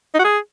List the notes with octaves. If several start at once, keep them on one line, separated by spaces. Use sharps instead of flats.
D#4
F#4
G#4